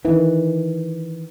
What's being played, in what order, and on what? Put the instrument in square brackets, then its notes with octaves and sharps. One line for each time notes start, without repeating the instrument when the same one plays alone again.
[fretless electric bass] D#3 E3